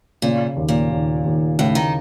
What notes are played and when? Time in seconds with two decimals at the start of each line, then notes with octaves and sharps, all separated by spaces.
0.22 A#2 C#3
0.56 D#2
0.69 A#2
0.90 D#2
1.24 D#2
1.58 A2 C#3
1.75 D#3